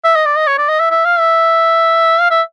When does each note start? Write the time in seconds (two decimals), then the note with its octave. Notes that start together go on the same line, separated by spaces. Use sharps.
0.04 E5
0.15 D#5
0.26 D5
0.37 D#5
0.47 C#5
0.58 D5
0.69 D#5
0.79 E5
0.91 E5
1.05 F5
1.19 E5
2.20 F5
2.31 E5